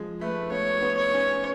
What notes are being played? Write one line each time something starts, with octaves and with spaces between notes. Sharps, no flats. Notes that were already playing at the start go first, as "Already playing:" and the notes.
Already playing: F3 G#3
A3 B4
B3 C#5
B3
C#5
C#4